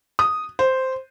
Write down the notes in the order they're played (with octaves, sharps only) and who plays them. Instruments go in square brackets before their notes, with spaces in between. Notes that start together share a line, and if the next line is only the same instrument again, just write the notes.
[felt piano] D#6
C5